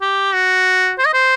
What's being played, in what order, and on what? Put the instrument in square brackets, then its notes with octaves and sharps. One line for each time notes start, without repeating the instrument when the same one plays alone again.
[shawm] G4
F#4
C5
D#5
C5